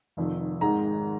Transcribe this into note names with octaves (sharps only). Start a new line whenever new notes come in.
F1 F2 D#3
G#1 G#2 D#3 G#3 A#5